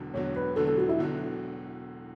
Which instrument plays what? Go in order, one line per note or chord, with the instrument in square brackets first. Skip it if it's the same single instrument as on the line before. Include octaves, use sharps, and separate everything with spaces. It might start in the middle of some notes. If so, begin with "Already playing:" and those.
Already playing: [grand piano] E1 E2 D3 F#3
[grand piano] E1 E2 D3 F#3 [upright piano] C#5
[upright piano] B4
[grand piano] E1 E2 D3 F#3 [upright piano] A4
[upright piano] A4
F#4
E4
[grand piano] E1 E2 D3 F#3